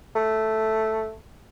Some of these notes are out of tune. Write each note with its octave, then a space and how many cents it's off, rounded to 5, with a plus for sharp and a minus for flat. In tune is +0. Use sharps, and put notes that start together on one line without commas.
A3 +0